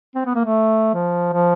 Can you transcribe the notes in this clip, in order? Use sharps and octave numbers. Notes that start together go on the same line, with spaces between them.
C4
B3
A#3
A3
F3
F3